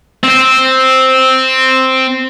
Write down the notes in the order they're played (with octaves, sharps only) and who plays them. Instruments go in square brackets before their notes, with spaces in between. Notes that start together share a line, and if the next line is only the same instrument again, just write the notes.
[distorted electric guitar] C4 C5